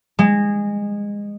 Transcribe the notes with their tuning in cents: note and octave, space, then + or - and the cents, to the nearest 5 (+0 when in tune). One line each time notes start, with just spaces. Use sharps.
G#3 -20